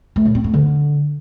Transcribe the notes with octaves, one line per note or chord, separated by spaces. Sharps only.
A3
A#2
C4
A3
D3